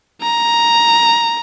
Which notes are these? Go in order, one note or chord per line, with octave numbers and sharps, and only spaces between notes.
A#5